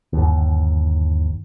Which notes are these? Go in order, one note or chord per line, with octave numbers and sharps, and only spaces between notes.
G1 D#2